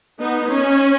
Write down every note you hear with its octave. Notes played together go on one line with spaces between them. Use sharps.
B3 D#4
C#4